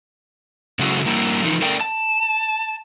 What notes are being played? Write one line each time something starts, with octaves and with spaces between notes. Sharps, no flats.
C#3 F#3 G#3 A3 E4 F#4
G3 A#3 E4
E3 F3 D#4
A3 A#4 D5 G5
A5